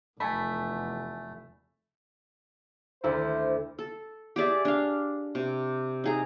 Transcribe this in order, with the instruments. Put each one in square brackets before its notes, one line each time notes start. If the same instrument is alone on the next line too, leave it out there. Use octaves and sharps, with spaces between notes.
[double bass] F1 E2 [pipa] A3 [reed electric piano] G#5 A5 B5
[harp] D2 E4 [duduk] C5
[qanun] A4
G4 G#4 D5 E5
D4 F5
C3
D#4 G#4 A#5